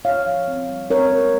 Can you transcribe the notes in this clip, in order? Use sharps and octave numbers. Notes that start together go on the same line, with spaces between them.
F4 C#5 F5
F3
C4
G3
C4 A#4 C#5
G#3